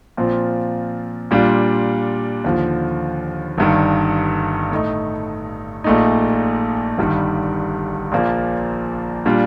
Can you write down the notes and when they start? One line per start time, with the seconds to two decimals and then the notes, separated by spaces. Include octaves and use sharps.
0.17 A#2 F3 C4 F4
1.31 A#2 G3 D4 F4
2.44 D#2 D3 F3
3.58 G1 G2 D#3
4.71 A2 A3 D#4
5.84 A#1 A#2 A3 D#4
6.98 G1 G2 D#3 G3
8.12 A#1 A#2 F3 A#3
9.25 A#2 G3 D4 F4